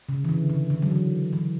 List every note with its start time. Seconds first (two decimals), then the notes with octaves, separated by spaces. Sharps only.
0.09 C#3
0.24 E3
0.29 D3
0.50 C#3
0.70 D3
0.82 F#3
0.91 E3
1.33 E3